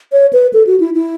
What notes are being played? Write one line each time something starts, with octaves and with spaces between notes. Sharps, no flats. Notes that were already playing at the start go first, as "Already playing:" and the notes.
C#5
B4
A4
F#4
E4
E4